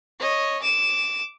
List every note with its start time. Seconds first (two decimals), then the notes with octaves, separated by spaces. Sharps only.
0.19 C#5 D#5
0.62 D6 E7